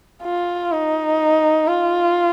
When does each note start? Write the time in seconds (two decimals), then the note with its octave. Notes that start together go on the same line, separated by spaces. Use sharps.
0.23 F4
0.72 D#4
1.67 F4